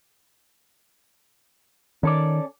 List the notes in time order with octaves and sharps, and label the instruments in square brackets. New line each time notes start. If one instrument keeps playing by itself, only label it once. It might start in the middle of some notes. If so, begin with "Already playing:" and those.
[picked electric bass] D#3 [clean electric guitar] C#4 A4 D5